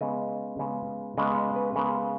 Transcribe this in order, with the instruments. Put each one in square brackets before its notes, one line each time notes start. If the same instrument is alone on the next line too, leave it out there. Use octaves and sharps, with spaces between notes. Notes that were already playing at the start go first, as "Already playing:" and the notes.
[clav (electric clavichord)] C#3 G#3 B3 D#5
C#3 G#3 B3
C#3 G#3 B3 D#5
D#5
B4
C#3 G#3 B3 A#4